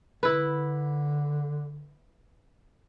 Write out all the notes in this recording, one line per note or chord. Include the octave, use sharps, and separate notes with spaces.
D3 E4 B4